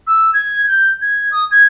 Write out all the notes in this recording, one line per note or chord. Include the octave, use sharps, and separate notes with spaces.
E6
G#6
G6
G#6
D#6
G#6